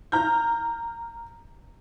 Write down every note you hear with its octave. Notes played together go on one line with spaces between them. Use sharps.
A#5 F6 G6